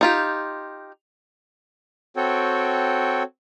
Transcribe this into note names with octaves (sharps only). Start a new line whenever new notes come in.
D#4 F4 G4
C4 F#4 A4 C#5 G5